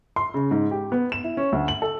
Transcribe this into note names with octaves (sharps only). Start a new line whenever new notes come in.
C6
C#3
G#2
G4
B3
E7
E4
C#4
D2
F#7
A4